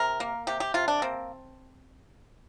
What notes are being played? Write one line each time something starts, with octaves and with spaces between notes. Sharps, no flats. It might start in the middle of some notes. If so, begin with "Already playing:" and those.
Already playing: C3 A#4
A#3
C3 G4
G4
C3 F4
D4
A#3 C4